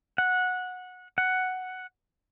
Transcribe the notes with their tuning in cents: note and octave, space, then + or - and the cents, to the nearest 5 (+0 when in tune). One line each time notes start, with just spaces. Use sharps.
F#5 -15
F#5 +5